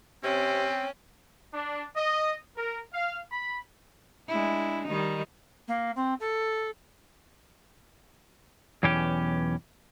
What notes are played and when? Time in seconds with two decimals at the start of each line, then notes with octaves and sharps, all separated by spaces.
0.24 C3 C4 C#4 G5
1.52 D4
1.96 D#5
2.55 A#4
2.93 F5
3.31 B5
4.28 G#3 D4 E4
4.86 D#3 G3 D#4
5.68 A#3
5.96 C4
6.20 A4
8.83 B1 E2 E3 C#4 G4